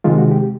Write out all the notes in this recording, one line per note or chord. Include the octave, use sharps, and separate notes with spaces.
C3 D#3 G#3 F4
F#4
G4